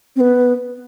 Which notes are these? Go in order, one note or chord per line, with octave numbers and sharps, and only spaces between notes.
C4
B3